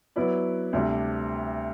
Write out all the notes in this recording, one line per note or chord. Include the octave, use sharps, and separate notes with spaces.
F#3 B3 E4 B4 D5
D2 C3 G3 D4